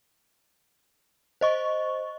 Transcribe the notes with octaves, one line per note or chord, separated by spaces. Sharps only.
C5 D#5 C#6